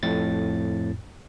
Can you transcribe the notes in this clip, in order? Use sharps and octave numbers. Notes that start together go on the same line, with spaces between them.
F2 A2 A6